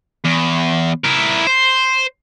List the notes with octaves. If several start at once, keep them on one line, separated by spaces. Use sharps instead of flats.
E2
E4 A#4
C5